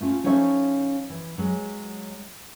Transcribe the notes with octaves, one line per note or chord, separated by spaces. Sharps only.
A3 C#4 F4
F3 C#4 D#4 A4 C#5 E5
E3
F#3 G#3